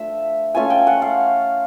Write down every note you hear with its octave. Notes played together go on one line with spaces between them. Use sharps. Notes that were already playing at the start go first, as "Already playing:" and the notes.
Already playing: F3 A3 D4 E5
A3 C#4 F4 G#5
G5
F#5
F5